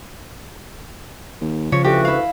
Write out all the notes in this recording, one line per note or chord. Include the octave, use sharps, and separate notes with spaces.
D#2
C#3 F3 C#5
D2 E3 F#4 G4
E4 F5